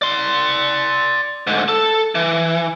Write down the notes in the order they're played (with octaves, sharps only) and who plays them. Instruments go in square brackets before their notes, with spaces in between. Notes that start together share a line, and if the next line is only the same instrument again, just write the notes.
[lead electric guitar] D5 C6
D2 G#2
A4
E3